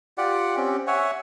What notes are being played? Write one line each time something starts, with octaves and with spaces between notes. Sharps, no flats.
F4 G4 D5 F#5
C4 C#4 G4
C#5 E5 F#5 G#5